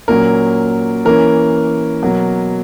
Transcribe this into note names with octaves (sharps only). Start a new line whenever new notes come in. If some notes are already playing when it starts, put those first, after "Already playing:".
A#2 F#3 C#4 A#4
E3 A#3 C#4 A#4
B2 F#3 A#3